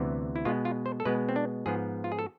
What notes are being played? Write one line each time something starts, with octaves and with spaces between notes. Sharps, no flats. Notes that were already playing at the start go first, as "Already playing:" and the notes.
Already playing: D2 C3 E3 B3
E4
B2 G#3 B3 F4
F4
C5
A4
B2 G#3 B3 B4
C4
D4
G#2 F3 B3 G#4
F4
G#4
A4